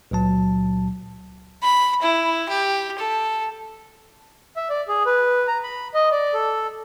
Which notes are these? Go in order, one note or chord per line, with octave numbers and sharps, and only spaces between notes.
C#2 A#2 F#3 A5
B5
E4
G4
A4
E5
D5
G#4
B4
A#5
B5
D#5
D5
A4